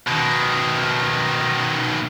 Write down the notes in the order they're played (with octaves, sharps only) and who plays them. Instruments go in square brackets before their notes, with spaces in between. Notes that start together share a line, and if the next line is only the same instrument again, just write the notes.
[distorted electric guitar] B2 D#3